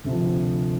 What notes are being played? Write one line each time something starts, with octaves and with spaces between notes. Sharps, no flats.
D2 C3 F3